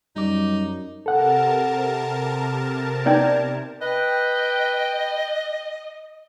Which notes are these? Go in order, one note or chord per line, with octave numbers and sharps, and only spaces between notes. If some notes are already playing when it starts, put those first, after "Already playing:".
F#2 G3 D#4 D6
C3 A4 A#4 F#5 A5
B3 D#4 D5 G5 G6 G#6
B4 D#5 G5